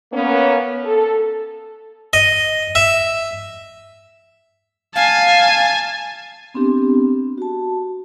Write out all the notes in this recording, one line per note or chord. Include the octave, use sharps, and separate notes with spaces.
A#3 B3 C#4
A4
D#5
E5
F5 G#5 A5
B3 C4 D4 G4
F#4 A5